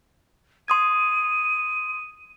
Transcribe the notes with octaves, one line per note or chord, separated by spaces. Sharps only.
C6 D#6 G#6 D#7